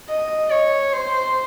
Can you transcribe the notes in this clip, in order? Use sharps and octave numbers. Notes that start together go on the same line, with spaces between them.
D#5
C#5
C5